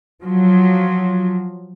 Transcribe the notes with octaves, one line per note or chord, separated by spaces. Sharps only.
F3 F#3